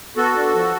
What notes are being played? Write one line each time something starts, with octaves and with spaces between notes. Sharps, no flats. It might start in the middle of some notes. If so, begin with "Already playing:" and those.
B3 F#4 A4
D4
F3